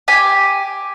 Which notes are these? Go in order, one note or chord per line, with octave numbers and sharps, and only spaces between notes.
G4 G#5